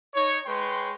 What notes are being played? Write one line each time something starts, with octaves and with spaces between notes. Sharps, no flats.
D#4 C#5
G#3 B4 C#5 G5 C6